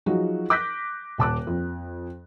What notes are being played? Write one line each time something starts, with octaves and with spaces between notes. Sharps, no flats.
F3 F#3 D#4 F#4 G#4
D6 F#6 G6 A#6 B6
D#1 A5 D6 F#6
F2